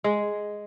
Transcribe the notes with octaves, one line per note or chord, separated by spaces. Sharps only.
G#3